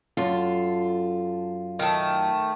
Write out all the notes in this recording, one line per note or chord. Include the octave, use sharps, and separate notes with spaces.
F#2 F4 A4
D#3 A3